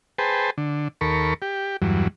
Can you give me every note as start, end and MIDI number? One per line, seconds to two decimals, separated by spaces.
0.18 0.50 68
0.18 0.50 71
0.18 0.50 72
0.18 0.50 79
0.18 0.50 81
0.58 0.88 50
1.01 1.34 39
1.01 1.34 69
1.01 1.34 70
1.01 1.34 83
1.01 1.34 85
1.42 1.77 67
1.82 2.08 40
1.82 2.08 43
1.82 2.08 54